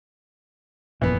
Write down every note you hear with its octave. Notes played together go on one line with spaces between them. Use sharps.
G1 F2 A#2 E3 B3